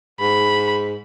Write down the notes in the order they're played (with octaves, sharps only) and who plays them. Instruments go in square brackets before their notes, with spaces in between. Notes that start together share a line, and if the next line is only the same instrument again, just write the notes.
[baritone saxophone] G#2 [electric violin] B5